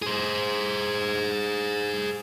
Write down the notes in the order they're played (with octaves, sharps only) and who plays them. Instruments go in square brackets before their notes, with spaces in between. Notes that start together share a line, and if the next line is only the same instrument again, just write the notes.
[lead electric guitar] G#4 C5